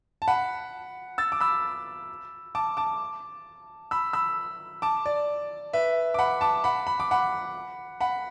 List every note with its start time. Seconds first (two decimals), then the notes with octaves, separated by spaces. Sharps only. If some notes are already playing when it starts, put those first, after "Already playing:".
0.22 A5
0.28 F#5 B5
1.18 E6 A6
1.32 D6
1.40 B5 E6
2.55 A5 D6
2.77 A5 D6
3.91 B5 E6
4.13 B5 E6
4.82 A5 D6
5.06 D5
5.73 B4 E5
6.14 D6
6.19 F#5 B5
6.41 A5 D6
6.64 F#5 B5
6.87 B5
7.00 D6
7.11 F#5 B5
8.01 F#5 B5